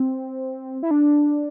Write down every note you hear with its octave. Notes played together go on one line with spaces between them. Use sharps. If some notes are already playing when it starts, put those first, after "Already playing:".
Already playing: C4
E4
D4